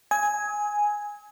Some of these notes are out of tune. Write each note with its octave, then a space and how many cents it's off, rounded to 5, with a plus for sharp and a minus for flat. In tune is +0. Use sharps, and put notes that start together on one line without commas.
G#5 +0 D#6 +45